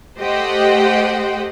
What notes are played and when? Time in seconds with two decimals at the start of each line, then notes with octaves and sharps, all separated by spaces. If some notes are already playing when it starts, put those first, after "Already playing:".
0.19 A3 G4 C5 D#5 F#5 G5